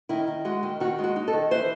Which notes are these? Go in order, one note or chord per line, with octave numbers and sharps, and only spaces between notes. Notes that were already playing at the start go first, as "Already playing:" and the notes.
D#3 E4
D#3
G#3 F#4
D#3
D#3 F#4
G#3 F#4
D#4
A4
D#3
E3 C5